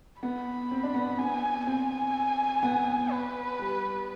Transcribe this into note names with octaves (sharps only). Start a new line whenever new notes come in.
B3 B5
C4
D4
B3
B3 G#5
C4 G#5
B3
B4
G3